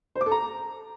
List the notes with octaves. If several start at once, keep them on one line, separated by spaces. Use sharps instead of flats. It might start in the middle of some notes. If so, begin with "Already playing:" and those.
C5
D6
A4
A#5